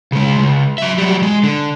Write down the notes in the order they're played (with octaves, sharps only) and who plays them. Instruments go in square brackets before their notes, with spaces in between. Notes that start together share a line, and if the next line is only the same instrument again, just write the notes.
[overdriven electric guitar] C#3 G#3
C#2
F#3 E5
F#3 G3
G#3
D3